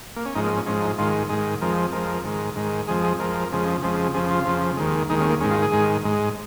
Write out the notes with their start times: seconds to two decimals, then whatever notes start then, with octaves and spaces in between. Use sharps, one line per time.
0.16 A#3
0.25 C#4
0.35 G#2 F3 G#3 D#4
0.45 A#3
0.56 C#4
0.66 G#2 F3 G#3 C#4
0.82 D#4
0.98 G#2 D#3 G#3 F4
1.30 G#2 D#3 G#3 G#4
1.61 F2 F3 G#3 A#4
1.92 F2 F3 G#3 A#4
2.24 G#2 D#3 G#3
2.56 G#2 D#3 G#3
2.88 F2 F3 G#3 G#4
3.04 G#4
3.19 F2 F3 G#3 A#4
3.52 F2 C#3 F3 G#3
3.83 F2 C#3 F3 G#3
4.14 F2 C#3 F3 G#4
4.31 F4
4.46 F2 C#3 F3
4.77 D#2 D#3 G#3
5.10 D#2 D#3 G#3 D#4
5.20 C#4
5.30 A#3
5.40 G#2 D#3 G#3 C#4
5.51 F4
5.63 G#4
5.72 G#2 D#3 G#3
6.04 G#2 G#3